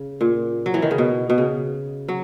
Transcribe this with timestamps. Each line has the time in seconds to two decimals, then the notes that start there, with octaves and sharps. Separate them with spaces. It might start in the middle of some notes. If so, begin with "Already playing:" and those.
Already playing: C#3
0.21 A#2
0.66 F#3
0.74 E3
0.82 D#3
0.91 C#3
0.98 B2
1.30 B2
1.38 C#3
2.08 F#3